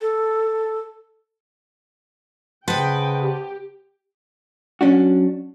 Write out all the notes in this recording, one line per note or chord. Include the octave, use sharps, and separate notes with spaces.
A4
C#3 B4 C5 D#5 F#5 G5 A5
G4
F#3 C#4 D4 F#4